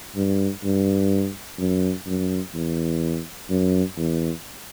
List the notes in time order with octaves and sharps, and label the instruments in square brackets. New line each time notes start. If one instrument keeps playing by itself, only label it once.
[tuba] G2
G2
F#2
F#2
E2
F#2
E2